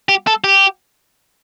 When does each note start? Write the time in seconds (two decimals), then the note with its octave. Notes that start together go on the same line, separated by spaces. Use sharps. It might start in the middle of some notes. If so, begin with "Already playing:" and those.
0.09 G4
0.27 A4
0.44 G4